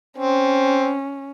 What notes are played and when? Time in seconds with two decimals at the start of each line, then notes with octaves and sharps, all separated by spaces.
0.18 C4 C#4